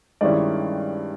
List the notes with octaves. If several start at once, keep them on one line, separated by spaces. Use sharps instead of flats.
G2 D#3 G#3 C#4 E4 D5